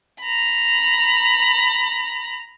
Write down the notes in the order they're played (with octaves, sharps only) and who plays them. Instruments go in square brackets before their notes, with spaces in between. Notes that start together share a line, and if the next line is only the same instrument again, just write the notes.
[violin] A#5 B5